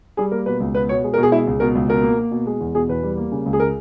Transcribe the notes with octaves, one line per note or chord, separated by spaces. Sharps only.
G3 G#4
A#3 A#4
B2 B4
C#2
B3 B4
B2 C#5
G#3
A#4
B2
G#4
G#3 E4
C#2
B2 A#4
C#2
B2 A#4
A#3
A#3
B2
G#3
E2
B2 G#4
E2 B4
G3
A#3
C#3
C#2
G#4
G#3 A#4